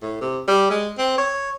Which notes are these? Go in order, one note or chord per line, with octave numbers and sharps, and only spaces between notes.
A2
C3
G3
G#3
C4
C#5